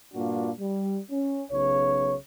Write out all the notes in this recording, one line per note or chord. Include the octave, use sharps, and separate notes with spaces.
G2 A#2 A#3 D4 F4 F#4
G3
C#4
B1 C#3 C#5